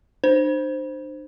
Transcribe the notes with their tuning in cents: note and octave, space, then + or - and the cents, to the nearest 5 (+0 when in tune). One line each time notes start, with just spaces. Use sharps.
D4 +45 C5 +0